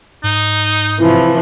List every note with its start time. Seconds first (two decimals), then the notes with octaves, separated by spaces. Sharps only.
0.24 G#2 D#4
0.99 C3 E3 F3 E4